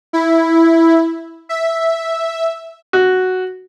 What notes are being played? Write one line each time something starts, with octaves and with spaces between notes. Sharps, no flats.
E4
E5
F#4